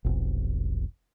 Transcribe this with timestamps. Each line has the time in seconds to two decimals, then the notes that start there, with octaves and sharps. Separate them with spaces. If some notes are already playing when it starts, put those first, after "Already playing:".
0.05 F1 B1